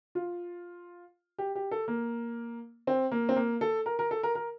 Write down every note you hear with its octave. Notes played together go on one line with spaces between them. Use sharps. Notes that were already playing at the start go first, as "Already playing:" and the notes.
F4
G4
G4
A4
A#3
C4
A#3
C4
A#3
A4
A#4
A#4
A4
A#4
A#4